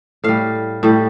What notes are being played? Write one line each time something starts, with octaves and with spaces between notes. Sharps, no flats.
A2 G3 F5
A2 G3